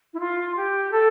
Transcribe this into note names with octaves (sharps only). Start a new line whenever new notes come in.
E4
F4
G4
A4